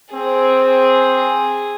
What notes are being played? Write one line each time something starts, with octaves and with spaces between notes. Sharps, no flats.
C4 G#4